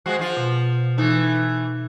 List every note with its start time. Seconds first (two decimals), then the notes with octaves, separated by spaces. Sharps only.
0.06 F3 G#3 F#4 C5
0.19 F3 F4
0.37 B2
0.98 E3 A3 D#4